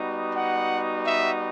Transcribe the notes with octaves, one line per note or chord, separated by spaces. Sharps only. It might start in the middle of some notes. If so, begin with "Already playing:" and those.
Already playing: G3 B3 D#4 F#4
F#5
E5